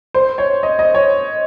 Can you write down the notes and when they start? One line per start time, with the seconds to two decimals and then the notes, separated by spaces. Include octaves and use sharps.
0.14 C5
0.38 C#5
0.63 D#5
0.79 D#5
0.94 C#5